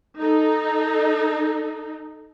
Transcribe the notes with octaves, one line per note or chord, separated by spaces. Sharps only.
D#4 A4